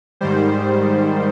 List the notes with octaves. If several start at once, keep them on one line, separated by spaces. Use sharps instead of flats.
G#2 D#3 G3 C5